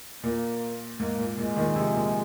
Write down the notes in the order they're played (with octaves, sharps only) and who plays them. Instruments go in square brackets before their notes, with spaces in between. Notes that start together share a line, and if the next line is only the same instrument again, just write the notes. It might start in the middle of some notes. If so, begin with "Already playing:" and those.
[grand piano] A#2 [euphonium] A#3
[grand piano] G#2 [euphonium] A#3
[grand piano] A#2
[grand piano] A#2 [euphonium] G#3
[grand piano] A#2 D#3
C3 F3
A#2